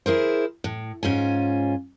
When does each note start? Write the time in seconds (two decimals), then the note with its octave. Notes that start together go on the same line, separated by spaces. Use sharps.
0.06 E4 G#4 A#4 C5
0.64 A2
1.03 G#2 C#4 F4 G#5